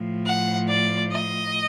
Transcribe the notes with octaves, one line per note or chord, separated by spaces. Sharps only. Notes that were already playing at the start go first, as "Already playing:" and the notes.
Already playing: A2 F3
F#5
D5
D#5